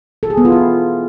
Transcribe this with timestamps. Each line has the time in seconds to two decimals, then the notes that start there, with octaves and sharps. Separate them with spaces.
0.23 A4
0.30 G#4
0.37 B3
0.45 F4
0.52 E4